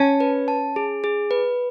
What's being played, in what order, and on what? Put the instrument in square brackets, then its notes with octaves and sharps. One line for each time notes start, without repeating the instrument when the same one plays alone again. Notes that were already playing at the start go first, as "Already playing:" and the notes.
Already playing: [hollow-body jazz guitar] C#4 [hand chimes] A5
[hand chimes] B4
A5
G#4
G#4
B4